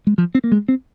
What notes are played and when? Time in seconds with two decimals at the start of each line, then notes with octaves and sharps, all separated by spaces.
0.07 G#3
0.18 F3
0.35 C4
0.44 A#3
0.52 G#3
0.68 C4